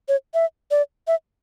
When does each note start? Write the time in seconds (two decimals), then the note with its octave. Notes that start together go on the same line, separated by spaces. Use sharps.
0.08 C#5
0.34 E5
0.71 D5
1.07 E5